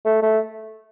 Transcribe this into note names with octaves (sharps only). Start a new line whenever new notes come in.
A3
A3